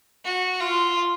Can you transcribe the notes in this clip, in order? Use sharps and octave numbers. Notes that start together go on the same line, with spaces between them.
F#4
F4